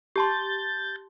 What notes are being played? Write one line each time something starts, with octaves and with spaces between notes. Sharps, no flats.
G4 A5 C6 G6 A6